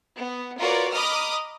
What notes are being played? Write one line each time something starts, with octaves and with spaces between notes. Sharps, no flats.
B3
F4 F#4 A#4 B4 C#5 D5
D#5 A#5 B5 D6 D#6 F6